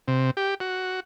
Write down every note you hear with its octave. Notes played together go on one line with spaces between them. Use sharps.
C3
G4
F#4